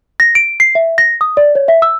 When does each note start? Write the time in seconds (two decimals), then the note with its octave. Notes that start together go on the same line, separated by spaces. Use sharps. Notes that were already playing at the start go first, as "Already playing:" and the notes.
0.20 A#6
0.35 D7
0.60 C7
0.75 E5
0.98 A#6
1.21 D#6
1.37 D5
1.55 C#5
1.68 E5
1.82 E6